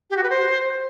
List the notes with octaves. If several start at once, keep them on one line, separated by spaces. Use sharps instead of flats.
G4
F#4
B4
C5